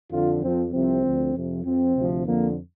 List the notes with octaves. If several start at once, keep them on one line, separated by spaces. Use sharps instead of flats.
F2 D3 F3 F4
F2 F3 C4
C2 C3 F3 C4
D2 D3 F3
F2 C3 F3
F2 F3 C4
D2 C3 F3
F2 D3 F3 A#3